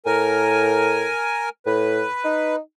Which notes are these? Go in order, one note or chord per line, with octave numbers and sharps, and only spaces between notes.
A2 A#4 G#5
A2 B4
D#4